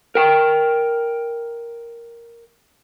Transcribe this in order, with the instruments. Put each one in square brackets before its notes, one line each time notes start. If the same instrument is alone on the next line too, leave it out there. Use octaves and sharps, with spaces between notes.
[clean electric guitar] A#4 G5